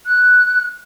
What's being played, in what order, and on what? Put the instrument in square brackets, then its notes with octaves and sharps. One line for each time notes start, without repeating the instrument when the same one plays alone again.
[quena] F#6